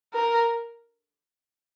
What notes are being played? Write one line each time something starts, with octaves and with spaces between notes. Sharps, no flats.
A#4